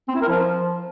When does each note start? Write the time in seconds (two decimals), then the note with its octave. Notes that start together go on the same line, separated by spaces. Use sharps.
0.09 C4
0.15 E4
0.22 A#4
0.29 F3